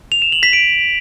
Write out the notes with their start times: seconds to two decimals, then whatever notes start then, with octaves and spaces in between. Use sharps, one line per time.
0.12 F7
0.22 E7
0.32 F#7
0.43 B6
0.53 D7